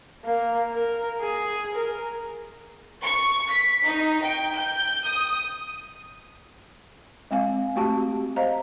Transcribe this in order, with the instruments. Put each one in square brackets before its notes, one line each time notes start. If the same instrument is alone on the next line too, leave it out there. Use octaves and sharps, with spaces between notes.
[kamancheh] A#3
A#4
G#4
A#4
[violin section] C#6
B6
D#4
G5
G6
D#6
[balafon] G#3 C4 F5 G#5
A3 C4 F#4 G4 A5
C5 D#5 F5 A#5